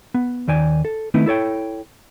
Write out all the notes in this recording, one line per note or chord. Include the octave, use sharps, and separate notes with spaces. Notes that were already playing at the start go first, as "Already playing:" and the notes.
B3
D#2 D#3 D5 G#5
A4
D#3 A3 B3 C4 D#4 E4
E4 A4 C#5 G5